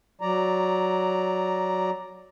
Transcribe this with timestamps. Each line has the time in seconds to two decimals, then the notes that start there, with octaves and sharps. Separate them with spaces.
0.21 F#3 D5 A#5